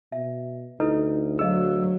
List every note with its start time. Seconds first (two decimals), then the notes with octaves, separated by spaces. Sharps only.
0.12 B2 E5
0.80 D2 D#4 E4 A4 B4
1.39 F#3 G#4 D#5 F5 E6